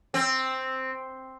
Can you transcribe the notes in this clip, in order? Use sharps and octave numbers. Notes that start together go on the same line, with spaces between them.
C4